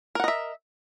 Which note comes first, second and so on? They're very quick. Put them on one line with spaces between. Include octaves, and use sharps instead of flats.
A#4 F#5 D#5 E5